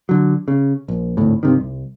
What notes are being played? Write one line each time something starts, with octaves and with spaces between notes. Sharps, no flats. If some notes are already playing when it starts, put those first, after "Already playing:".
D3 F#3
C#3
A#1
G#1 D2 A2
G2 C3 D#3
C2